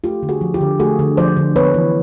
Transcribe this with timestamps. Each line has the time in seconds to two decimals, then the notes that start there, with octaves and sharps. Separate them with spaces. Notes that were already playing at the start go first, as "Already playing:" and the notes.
0.04 A3 F4 G4
0.23 D3
0.29 F#4 G#4
0.41 F3
0.54 F4 G4
0.61 D3
0.80 A3 F#4 G#4
0.99 D3
1.17 F3 C5 D5
1.37 D3
1.56 B3 B4 C#5
1.74 E3